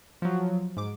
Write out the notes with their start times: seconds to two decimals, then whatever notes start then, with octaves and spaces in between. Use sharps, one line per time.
0.22 F3 F#3
0.77 G#2 D6